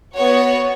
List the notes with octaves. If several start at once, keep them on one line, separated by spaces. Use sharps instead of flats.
B3 F#4 C#5